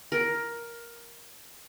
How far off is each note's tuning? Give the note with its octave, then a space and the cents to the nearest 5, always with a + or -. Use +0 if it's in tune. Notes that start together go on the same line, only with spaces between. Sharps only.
A#4 +10